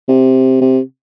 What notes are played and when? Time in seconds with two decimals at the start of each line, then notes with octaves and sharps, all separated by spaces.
0.08 C3
0.61 C3